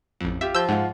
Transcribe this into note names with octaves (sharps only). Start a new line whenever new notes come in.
A1 F2
F4 G4 E5
F3 E6 G6
G#2 F4 F#5